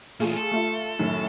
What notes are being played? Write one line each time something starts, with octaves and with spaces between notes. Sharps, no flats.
A#2 E3 A3 F4 G#4
A4
A3 F4 E5
F#2 A2 D#3